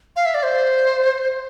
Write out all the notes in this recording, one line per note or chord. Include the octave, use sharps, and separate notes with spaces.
F5
E5
D5
C5